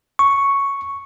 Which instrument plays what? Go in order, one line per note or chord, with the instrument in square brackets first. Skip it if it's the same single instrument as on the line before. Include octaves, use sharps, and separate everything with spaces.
[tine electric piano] C#6